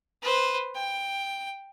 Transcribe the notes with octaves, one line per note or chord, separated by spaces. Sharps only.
B4 C5
G5